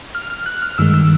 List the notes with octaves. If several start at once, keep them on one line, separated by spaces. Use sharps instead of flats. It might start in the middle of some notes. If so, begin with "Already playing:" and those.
F6
F6
F#6
F6
G2 D#3 G#3 E6
E6